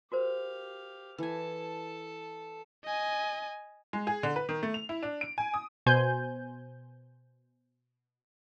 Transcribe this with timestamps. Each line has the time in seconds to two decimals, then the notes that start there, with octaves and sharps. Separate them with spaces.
0.12 F#4 G4 A#4 C5 F5
1.18 E3 A4 G#5 A5
2.85 D#5 G#5
3.93 G#3
4.07 G#4
4.23 D3
4.36 B4
4.49 D#3
4.63 A3
4.74 F7
4.89 E4
5.03 D4
5.21 D7
5.38 G#5
5.54 D#6
5.86 B2 C5 G#5 G6